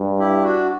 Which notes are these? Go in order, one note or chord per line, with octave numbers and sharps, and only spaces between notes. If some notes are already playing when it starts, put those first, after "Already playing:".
Already playing: G2
E4 G4
D4 F#4